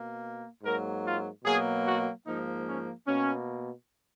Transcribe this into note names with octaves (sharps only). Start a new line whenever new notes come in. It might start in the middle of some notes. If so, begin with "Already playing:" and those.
Already playing: B2 A#3
G#2 F#3 A#3 A#4
F4
B2 F#3 A#3 G#4
F#4
G#2 F3 A#3 D#4
C#4
B2 A#3 C#4